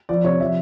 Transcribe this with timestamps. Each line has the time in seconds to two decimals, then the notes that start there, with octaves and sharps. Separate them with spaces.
0.09 F3 D5
0.24 C3 C#5
0.40 F3 E5